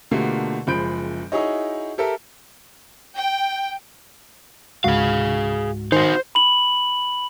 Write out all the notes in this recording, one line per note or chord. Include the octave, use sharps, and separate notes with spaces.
B2 D3 A3 A#3 F4 G4
F#1 F3 G#3 B5 G6 D7
D#4 E4 F#4 G#4 C#5 D#5
G4 A4 A#4 E5
G5
C#2 G#2 F#4 G#4 F5
D#3 D#4 F#4 C5 G#5 C6
B5 F#7